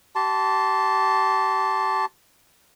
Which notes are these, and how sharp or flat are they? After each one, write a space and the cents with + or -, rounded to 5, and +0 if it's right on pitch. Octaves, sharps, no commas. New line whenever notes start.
G4 -35 A5 +0 C6 +0